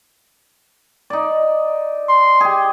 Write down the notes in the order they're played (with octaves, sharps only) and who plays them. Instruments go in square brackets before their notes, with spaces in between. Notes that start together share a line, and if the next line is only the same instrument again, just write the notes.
[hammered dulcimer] D#4 D5
[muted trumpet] C6
[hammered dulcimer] G4 G#4